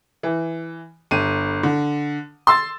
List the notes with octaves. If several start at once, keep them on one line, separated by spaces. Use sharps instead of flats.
E3
G1 D#7
D3
C6 E6 A6